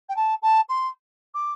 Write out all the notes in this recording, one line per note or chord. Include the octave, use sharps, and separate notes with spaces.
G5
A5
A5
C6
D6